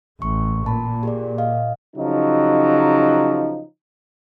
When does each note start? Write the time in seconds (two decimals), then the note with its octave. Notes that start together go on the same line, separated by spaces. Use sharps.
0.22 A1 C#6
0.66 A#2 A5 B5
1.03 G4 G#4 D5
1.38 D#5 F5
1.96 C#3 F3 F#3 D#4